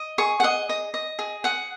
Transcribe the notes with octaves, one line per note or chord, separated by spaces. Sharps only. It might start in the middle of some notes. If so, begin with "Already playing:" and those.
Already playing: D#5
G#4 C#6
F#5
G#4 D#5
D#5
D#5
G#4
G#4 F#5